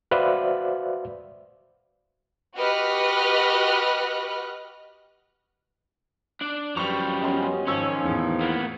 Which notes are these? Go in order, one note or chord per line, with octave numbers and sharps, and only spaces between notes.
F#4 B4 C5 D5 E5 F5
F#4 G4 B4 D#5 F6 F#6
D4 D5
F#2 F3 G3 B4 C#6 F7
B3 C#4 G4 D#5 C6
G#1 D#3 F3 C#4 C#5 E6
A1 E2 A2
A#3 B3